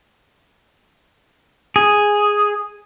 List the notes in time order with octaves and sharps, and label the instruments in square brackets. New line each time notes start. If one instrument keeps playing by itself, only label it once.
[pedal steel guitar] G#4